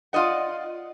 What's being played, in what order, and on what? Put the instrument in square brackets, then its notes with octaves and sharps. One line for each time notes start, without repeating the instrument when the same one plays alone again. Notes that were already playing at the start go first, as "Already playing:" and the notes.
[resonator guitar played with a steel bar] F4 D5 D#5 F#5